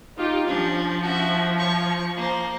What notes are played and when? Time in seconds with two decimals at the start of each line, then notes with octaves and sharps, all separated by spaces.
0.16 D#4 F4 G4
0.47 F3 C#4 D4
1.02 F#4 E5
1.58 C#5 C#6
2.17 A#3 C5